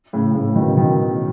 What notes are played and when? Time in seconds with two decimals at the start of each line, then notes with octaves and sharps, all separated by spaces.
0.13 A2 C#3
0.34 A2 C#3
0.55 B2 D#3
0.77 B2 D#3